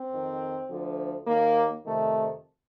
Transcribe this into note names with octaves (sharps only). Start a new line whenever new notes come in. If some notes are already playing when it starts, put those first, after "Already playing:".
Already playing: C4
F2 D#3
D2 D3 F3
D#2 D#3 A#3
F2 C3 D#3 A3